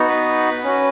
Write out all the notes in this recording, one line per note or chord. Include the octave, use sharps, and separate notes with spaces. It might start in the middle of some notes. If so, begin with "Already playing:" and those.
Already playing: B3 D#4 F#4
B4
C#4 F#4